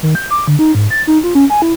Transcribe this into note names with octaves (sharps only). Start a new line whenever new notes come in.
D#3
G6
D6
D3
D#4
G#2
A6
D#4
F4
C#4
G#5
E4